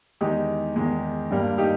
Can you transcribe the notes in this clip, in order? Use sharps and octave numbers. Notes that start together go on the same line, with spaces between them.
E2 D#3 G#3 D#4 G4
E2 D#3 G#3
G2 G3 A#3
D#4 G4